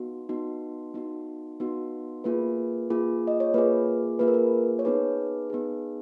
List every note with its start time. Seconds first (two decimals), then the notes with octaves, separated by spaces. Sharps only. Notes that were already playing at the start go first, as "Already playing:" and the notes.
Already playing: B3 D#4 F#4
0.29 B3 D#4 F#4
0.94 B3 D#4 F#4
1.60 B3 D#4 F#4
2.24 A#3 F4 G#4 B4
2.90 A#3 F4 G#4
3.27 D#5
3.40 C#5
3.54 A#3 F4 G#4 B4
4.19 A#3 F4 G#4 B4
4.28 A#4
4.34 B4
4.79 C#5
4.85 B3 D#4 G#4 B4
5.50 B3 D#4 G#4